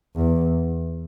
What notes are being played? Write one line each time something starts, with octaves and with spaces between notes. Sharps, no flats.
E2